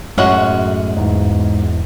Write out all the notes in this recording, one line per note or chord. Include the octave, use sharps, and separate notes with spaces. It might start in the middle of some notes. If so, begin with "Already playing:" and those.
F#2 A2 G#3 C#4 F#4
E2 G#2